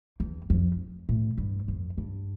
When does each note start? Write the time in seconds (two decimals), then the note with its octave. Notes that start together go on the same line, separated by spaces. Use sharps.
0.20 E2
0.50 F2
1.09 A2
1.38 G2
1.68 F2
1.98 G2